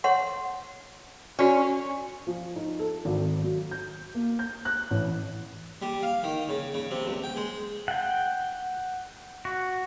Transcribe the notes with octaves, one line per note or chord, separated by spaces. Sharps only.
C#5 F#5 C6
C#4 F#4 D5
F3
D#4
A4
G#1
F#3
G6
A#3
G6
F#6
A1
G3
F5
D#3
C#3
C#3
C3
C#2
G5
G#3
F#5 G5
F#4